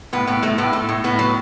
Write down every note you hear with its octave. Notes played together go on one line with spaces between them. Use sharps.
A2 B3
A2 B3
A2 A3
A2 B3
A2 A3
A2
A2 B3
F#3